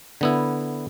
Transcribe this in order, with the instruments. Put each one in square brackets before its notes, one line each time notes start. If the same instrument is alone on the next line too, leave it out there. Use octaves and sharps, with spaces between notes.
[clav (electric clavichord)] D3 B3 E4